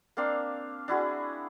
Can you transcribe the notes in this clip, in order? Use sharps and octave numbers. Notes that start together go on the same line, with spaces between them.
A#3 C4 D4 F5
D4 E4 F#4 G#4